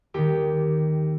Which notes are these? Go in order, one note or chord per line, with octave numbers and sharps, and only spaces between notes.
D#2 D#3 G4